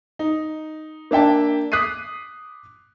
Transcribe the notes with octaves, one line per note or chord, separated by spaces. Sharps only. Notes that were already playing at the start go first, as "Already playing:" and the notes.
D#4
A#3 D4 E5 G5 A5
D6 D#6 F#6 B6 C7 D#7